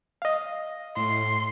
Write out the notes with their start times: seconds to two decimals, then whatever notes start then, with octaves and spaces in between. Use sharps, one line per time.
0.22 D#5 F5
0.97 A2 C6